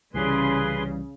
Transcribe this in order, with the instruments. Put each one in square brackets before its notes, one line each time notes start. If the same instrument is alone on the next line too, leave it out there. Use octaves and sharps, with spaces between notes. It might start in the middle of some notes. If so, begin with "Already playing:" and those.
[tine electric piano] C2 E3 G3 [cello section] C#3 [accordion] G#4 B4 C6